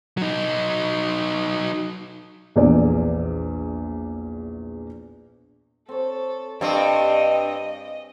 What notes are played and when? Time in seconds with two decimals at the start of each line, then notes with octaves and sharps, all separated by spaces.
0.17 F#3 D#4
2.56 A#1 E2 D5
5.89 C4 A4 C#5
6.61 G2 C4 G4 G#4 D#5